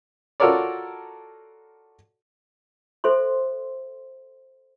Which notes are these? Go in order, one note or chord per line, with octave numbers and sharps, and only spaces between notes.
F4 F#4 A4 A#4 C#5 D5
A4 C5 E5 C6